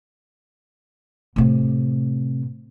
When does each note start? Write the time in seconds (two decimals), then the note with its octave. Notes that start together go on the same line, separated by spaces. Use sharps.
1.36 A2 C3